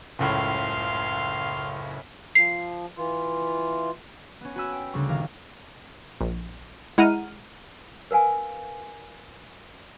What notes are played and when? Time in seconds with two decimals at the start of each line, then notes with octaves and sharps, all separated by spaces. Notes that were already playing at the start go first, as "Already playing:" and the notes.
0.19 F#1 C#2 A2 F5 C6
2.35 F3 C7
2.97 E3 F4
4.41 B3 C#4
4.56 F#4 G#5 B5 E6
4.72 G5
4.93 D2 C#3 G3 C4 C#6
5.09 A#1 D#3 A#4 F5
6.21 A#1
6.98 G#3 E4 F#5 A#5 F6 D#7
8.11 A#4 B4 F5 G#5